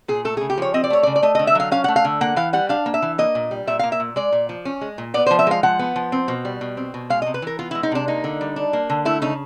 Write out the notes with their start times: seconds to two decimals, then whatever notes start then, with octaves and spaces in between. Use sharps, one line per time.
0.08 A#2 G#4
0.25 A3 A4
0.37 G#4
0.41 C#3
0.50 G4
0.58 F3 C#5
0.74 C4 D#5
0.84 D5
0.90 A3 C#5
1.03 C#3 D5
1.16 D5
1.22 A3 D#5
1.35 D#5
1.39 D3
1.47 E5
1.55 F#3 F5
1.71 C#4 F5
1.84 F#5
1.88 A3
1.96 F5
2.05 D3
2.21 A#3 F#5
2.36 E3 F5
2.53 G3 F#5
2.69 D4 F5
2.86 A#3
2.94 E5
3.02 E3
3.18 A#3 D#5
3.35 A#2
3.51 G3
3.67 A#2 E5
3.79 F5
3.83 A#3
3.92 E5
4.00 A#2
4.16 G#3 D5
4.32 A#2
4.49 F3
4.65 C#4
4.81 G#3
4.98 A#2
5.14 B3 D5
5.26 C5
5.31 F3
5.39 E5
5.47 G#3 F5
5.63 F3 F#5
5.79 B3
5.96 F3
6.12 C4
6.28 B2
6.45 G3
6.61 B2
6.77 C4
6.94 B2
7.10 G#3 F5
7.22 D#5
7.26 C3
7.34 B4
7.42 E3 A#4
7.59 B3 F4
7.71 E4
7.75 G#3
7.83 D#4
7.92 C3 D4
8.08 A#3 D#4
8.24 D3
8.41 G3
8.56 D4
8.73 A#3
8.90 D3
9.05 A3 E4
9.22 C#3 D#4